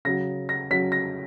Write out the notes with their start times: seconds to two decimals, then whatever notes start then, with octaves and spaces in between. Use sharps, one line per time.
0.05 C#3 F#3 A#6
0.49 A#6
0.70 C#3 F#3 B6
0.92 A#6